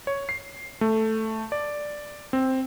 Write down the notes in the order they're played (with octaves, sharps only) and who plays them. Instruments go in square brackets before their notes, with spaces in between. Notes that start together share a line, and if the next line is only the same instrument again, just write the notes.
[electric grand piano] C#5
C7
A3
D5
C4